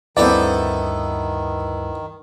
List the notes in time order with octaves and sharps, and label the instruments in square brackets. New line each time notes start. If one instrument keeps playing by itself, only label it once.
[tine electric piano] D2 G2 [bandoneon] D#3 [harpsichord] B3 E4 A4 [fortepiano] C4 D5